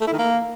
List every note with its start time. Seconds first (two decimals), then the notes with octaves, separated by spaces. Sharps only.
0.01 A3
0.07 E4
0.13 D#3
0.19 A#3